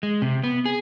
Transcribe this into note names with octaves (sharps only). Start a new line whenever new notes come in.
G#3
C3
B3
G#4